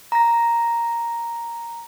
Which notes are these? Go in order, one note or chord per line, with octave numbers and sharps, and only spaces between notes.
A#5 A#6